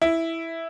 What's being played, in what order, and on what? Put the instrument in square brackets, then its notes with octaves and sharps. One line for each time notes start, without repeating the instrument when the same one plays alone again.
[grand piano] E4